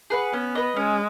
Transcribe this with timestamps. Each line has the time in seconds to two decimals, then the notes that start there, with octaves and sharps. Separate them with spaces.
0.10 G#4 B4 F#5
0.33 B3 C#4
0.55 B4 D#5
0.76 G#3 C#4